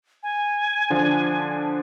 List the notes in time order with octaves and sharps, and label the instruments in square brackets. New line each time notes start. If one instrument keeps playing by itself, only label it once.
[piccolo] G#5
[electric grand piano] D3 F3 D4